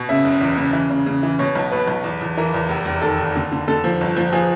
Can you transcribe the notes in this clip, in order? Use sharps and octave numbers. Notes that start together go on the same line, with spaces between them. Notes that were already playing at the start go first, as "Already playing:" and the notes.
Already playing: B2
C#3 E5
F#1
E2
C#3
E3
C#3
C#3
E3
B2 C#5
B1
B2 B4
B1
E2
E2
E3 A#4
E2
F1
F1
D#3 A4
D#2
D3
D3
D3 A4
F3
G1
F3
F3 G#4